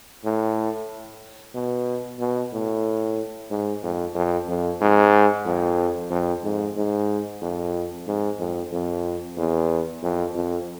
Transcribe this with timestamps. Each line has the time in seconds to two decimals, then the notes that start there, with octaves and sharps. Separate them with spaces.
0.25 A2
1.54 B2
2.19 B2
2.53 A2
3.50 G#2
3.83 F2
4.15 F2
4.49 F2
4.81 G#2
5.46 F2
6.10 F2
6.44 G#2
6.76 G#2
7.41 F2
8.07 G#2
8.39 F2
8.72 F2
9.37 E2
10.02 F2
10.35 F2